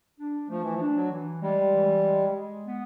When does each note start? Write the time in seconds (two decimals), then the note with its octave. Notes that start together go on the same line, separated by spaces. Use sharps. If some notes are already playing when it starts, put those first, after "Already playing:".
0.19 D4
0.49 F3 A3
0.62 E3
0.74 F3
0.80 D4
0.96 F#3
1.11 E3
1.41 G3 G#3
1.73 E3
2.03 G#3
2.33 G#3
2.66 B3